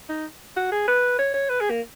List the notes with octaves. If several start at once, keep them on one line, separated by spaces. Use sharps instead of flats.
D#4
F#4
G#4
B4
C#5
C#5
B4
G#4
A#3